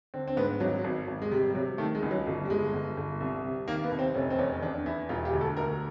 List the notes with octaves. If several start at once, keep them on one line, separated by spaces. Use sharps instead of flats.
D3 C4
C4
G#2 B3
G#1 F#3
G#1
G#1
G#3
C3 G3
G3
C3 F#3
D#3 A3
G#3
C#2
F#3
G1
G3
G1 G#3
G1
G1
C2
C3
D#3 A#3
B3
C2
C4
F1 C#4
C4
E2 C#4
E2 D4
E2 E4
E1 F4
G4
D2
A4
D2 A#4